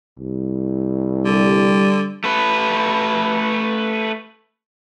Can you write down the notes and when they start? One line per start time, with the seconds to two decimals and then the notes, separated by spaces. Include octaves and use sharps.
0.19 C2
1.25 D3 G3
2.24 A3 B4